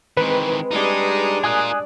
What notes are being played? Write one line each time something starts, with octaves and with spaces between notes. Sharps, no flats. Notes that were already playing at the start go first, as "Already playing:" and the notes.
D#3 E3 G#3 C4 B4
G3 G#3 D4 D#4 G#4
F4 A#4 D5 G#5 D#6 F#6